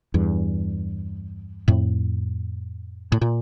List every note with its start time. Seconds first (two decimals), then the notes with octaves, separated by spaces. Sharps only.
0.14 E2 G2
1.68 F2 A2
3.12 A2
3.22 A#2